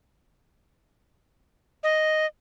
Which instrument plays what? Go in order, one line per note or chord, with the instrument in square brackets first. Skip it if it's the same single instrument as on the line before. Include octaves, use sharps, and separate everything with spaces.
[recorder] D#5